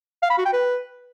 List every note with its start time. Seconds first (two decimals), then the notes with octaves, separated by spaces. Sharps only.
0.23 F5
0.30 B5
0.38 F#4
0.45 G5
0.53 B4